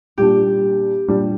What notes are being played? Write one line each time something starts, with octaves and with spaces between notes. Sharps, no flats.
A#2 G3 D4 G4
A#2 G3 D4